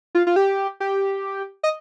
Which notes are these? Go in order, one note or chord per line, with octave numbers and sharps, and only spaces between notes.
F4
F4
G4
G4
D#5